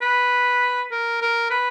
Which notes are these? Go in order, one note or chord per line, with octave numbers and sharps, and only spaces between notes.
B4
A#4
A#4
B4